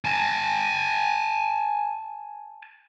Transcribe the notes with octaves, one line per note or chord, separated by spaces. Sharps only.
G#5 A5